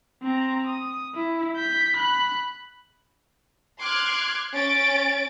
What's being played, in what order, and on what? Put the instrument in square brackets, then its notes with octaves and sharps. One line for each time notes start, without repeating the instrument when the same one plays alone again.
[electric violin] C4 A#5
D#6
E4
G6 B6
B5 F#6
[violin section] C6 D6 F6 F#6 G#6
C#4 A6 D7